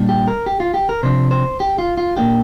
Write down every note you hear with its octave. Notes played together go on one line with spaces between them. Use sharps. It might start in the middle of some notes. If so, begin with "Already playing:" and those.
Already playing: A#2 G3 D4
G4
A#4
G4
F4
G4
A#4
C3 F3 D4 C5
C5
G4
F4
F4
A#2 A#3 D4 G4